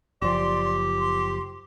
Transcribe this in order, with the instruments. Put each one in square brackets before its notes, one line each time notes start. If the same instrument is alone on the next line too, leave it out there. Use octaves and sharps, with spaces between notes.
[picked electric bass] F#1 F3 [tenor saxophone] G4 [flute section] D5 C6
[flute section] C6